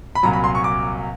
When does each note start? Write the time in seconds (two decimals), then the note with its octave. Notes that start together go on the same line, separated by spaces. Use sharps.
0.15 B5
0.23 C2 A#2 F#3 A#5
0.33 B5
0.44 C6
0.55 C#6
0.64 D6